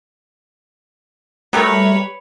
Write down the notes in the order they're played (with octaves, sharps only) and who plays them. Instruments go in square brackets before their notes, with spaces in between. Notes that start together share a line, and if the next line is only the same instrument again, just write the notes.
[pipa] F#3 G4 A#4 [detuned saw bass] G3 [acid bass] A3 [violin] B4 C#5